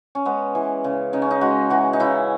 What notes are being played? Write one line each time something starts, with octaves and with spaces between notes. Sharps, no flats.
C#4
G#3 B3
E3
C#3
C#3 D#4
C#4
D#4
G#3 F#4
E3 F#4
D#4
C#3 E4